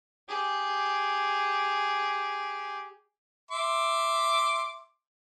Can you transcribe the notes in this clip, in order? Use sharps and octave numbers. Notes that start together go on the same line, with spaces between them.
G4 G#4
E5 C6 D6